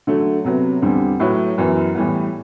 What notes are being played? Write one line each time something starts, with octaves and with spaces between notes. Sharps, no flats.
D3 F#3 A3
C3 F#3 B3
E2 D3 G3 C4
A2 F#3 A3 E4 B4
F#2 E3 B3
A2 E3 G3 B3